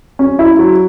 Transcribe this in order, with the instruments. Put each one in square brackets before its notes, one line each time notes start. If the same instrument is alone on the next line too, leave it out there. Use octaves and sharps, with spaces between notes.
[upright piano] C#4
E4
F#3